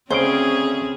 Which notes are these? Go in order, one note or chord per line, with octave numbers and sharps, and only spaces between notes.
D2 C#3 C4 C#4 G#4 C5 G5